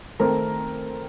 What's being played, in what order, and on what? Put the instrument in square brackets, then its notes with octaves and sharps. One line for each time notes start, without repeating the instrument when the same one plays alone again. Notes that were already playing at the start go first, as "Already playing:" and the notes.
[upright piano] D#3 A3 C4 A#4 A#5